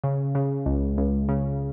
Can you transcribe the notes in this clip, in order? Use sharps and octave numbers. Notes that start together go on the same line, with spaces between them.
C#3
C#3
C#2
C#2
C#3